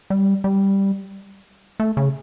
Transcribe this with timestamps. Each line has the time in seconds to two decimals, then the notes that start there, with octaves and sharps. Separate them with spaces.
0.10 G3
0.44 G3
1.80 A3
1.97 C#3